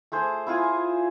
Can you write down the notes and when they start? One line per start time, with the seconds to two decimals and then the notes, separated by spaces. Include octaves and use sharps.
0.12 A3 G#4 C5
0.47 E4 F4 G#4 G#5